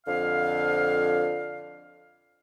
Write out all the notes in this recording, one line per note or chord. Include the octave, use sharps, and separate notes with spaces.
F2 D3 F5